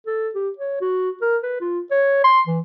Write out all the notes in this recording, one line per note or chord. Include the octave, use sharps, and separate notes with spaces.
A4
G4
C#5
F#4
A#4
B4
F4
C#5
C6
E3